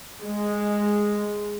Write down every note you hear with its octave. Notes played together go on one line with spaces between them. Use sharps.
G#3